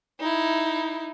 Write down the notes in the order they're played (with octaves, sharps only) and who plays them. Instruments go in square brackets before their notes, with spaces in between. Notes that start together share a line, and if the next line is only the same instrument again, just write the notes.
[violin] D#4 E4